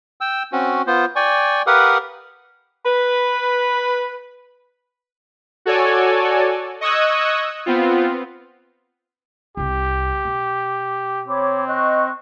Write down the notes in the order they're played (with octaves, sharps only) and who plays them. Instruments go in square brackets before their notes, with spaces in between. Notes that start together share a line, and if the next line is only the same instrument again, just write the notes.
[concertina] G5 E6
C4 C#4 F#4
B3 F4 C5
D5 G5 G#5 C#6
G4 A#4 B4 F5 F#5 D#6
[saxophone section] B4
[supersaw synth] F#4 A4 C#5 D5 G#5
D#5 C#6 D#6 E6 F#6 G#6
B3 C4 F4
[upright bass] C2 C4 [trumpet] G4
[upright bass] B2
[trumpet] C4 [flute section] C#5 B5 D6
[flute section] D#5 C#6 F#6